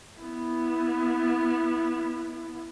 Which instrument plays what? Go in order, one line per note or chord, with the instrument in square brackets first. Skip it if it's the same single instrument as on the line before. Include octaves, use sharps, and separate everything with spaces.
[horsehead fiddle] B3 E4